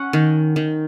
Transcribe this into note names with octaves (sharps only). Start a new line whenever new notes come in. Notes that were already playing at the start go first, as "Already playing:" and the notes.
Already playing: C#4 F#5
D#3
D#3